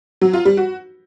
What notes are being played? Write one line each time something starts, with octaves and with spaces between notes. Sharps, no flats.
F#3
F4
G3
F#4